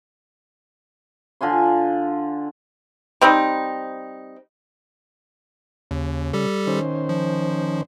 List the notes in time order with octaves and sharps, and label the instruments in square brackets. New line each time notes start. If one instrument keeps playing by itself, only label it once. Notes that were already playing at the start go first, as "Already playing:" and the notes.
[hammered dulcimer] D3 F4 G#5 C6
[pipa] G3 C4 D#4
[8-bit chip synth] D#2 [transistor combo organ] C#3
[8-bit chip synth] G3 G4 A4
[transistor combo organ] D#3 C#4 C5
[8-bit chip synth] F3